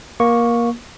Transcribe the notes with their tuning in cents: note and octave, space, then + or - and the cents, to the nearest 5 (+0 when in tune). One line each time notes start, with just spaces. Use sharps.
A#3 +20 C#6 +0